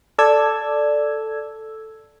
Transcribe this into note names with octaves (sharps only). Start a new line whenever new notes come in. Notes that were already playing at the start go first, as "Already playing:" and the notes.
A4 D5 E6 G#6